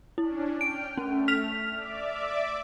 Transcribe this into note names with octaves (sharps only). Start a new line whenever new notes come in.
C#4 D4 E4
G5 F6 D7
A3 C#4
F6 B6 F7
D5 E5 D6